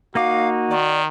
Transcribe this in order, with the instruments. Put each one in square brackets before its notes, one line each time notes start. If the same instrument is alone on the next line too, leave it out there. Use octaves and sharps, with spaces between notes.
[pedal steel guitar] A#3 D#4 D6 [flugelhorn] F#4 [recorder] F5
[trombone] D#3 [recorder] D5